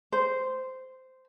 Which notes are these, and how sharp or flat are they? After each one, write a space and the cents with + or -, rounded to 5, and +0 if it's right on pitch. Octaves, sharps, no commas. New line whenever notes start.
C5 -10